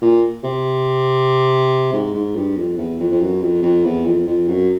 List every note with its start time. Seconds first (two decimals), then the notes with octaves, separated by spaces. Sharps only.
0.01 A#2
0.44 C3
1.93 G#2
2.14 G#2
2.36 G2
2.57 F2
2.78 E2
2.99 F2
3.12 F2
3.20 F#2
3.41 F2
3.62 F2
3.84 E2
4.05 F2
4.27 F2
4.48 F#2